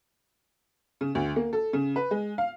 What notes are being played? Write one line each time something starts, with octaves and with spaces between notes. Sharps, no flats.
C#3
D2
A#3
A4
C#3
B4
G#3
F5